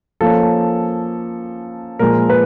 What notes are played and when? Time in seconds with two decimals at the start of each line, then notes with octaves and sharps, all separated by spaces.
0.21 F3 A#3 C#4 A4
1.99 A#2 F3 G#3 A#4
2.29 B4